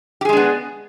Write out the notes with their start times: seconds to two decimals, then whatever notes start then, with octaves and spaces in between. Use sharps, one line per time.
0.21 G4
0.25 G#4
0.29 G#3
0.33 D4
0.37 B3